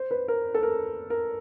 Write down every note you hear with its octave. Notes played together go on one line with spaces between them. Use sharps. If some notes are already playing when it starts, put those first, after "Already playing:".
Already playing: C5
B4
A#4
A4
A#4
A#4